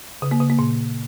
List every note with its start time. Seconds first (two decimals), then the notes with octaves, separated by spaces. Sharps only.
0.22 C#3
0.31 A#3
0.40 C#3
0.50 A#3
0.59 A#2